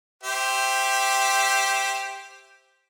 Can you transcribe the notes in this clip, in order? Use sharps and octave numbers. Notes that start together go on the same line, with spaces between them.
G4 C5 E5